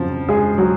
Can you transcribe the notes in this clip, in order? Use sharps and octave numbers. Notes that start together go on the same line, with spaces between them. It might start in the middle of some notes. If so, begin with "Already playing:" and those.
Already playing: F2 C#3 F3 F#3
G#3 G#4
F#3 F#4